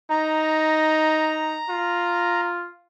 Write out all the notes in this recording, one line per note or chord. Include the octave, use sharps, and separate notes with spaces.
D#4 A#5
F4